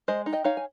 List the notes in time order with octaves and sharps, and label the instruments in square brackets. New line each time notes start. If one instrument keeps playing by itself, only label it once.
[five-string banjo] G#3 C5 D#5
D#4
D#5 G5
D#4 C#5 F5
G#5